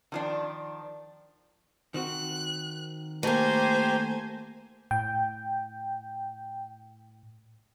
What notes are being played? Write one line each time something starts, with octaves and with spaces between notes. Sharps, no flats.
D#3 F3 D4
D#3 C4 F#4 F#6
A3 A#3 G4 C5 G5 G#5 A#5
A2 G5